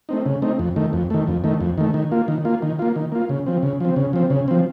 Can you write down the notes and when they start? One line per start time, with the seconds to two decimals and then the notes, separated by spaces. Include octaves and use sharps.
0.09 A3 C4 D#4
0.26 C#3
0.42 A3 C4 D#4
0.59 F2
0.76 D#3 A3
0.93 F2
1.10 D#3 A3
1.27 F2
1.44 D#3 A3
1.61 F2
1.78 D#3 A3
1.94 D#3
2.12 A#3 F4
2.28 D#3
2.45 A#3 F4
2.62 D#3
2.79 A#3 F4
2.96 D#3
3.12 A#3 F4
3.29 C#3
3.46 F3 C4
3.63 C#3
3.80 F3 C4
3.96 C#3
4.13 F3 C4
4.30 C#3
4.48 F3 C4